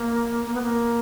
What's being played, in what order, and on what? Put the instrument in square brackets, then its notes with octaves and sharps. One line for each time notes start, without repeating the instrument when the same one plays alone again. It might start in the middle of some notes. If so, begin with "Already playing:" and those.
Already playing: [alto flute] A#3
A#3
B3
A#3